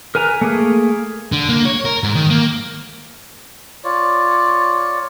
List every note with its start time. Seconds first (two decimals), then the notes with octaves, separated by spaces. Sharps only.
0.15 A#4 B4 G#5 A#5
0.41 A3 A#3 G#4
1.32 D3
1.49 A#3
1.66 C#5
1.85 A#4
2.03 G#2
2.15 D#3
2.30 A#3
3.84 F4 C#5 D5